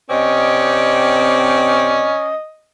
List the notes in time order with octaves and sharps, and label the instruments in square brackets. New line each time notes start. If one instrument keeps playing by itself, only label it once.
[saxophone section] C3 C4 D5 [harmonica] C#4 [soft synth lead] D#5